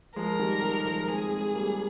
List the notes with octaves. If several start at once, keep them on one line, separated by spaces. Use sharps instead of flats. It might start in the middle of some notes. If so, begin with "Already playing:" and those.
F3 G#3 A#4
D#3 G3
D#3 G3
F3 G#3
G#3 C4 G#4
G#3 C4
G3 A#3